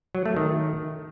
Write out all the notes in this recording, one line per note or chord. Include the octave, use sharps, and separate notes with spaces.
F#3
A3
D#3